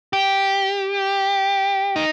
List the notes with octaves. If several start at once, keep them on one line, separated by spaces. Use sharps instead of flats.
G4
D#4